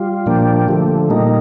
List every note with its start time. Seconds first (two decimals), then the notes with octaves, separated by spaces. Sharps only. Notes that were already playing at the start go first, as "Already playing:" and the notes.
Already playing: G3 F4
0.26 A#2 F3 A#3 D4 G4
0.68 D3 F3 A3
1.10 A#2 G3 A#3 D#4